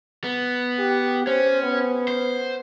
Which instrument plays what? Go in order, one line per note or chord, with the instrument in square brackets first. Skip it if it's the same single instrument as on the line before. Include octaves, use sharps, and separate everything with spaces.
[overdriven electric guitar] B3
[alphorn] G4
[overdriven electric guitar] C#4 [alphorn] C5
[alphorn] B3
[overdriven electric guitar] C5